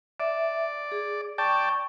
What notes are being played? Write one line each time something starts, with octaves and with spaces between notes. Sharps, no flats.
D5 E5
G#4
D5 G5 A5 C#6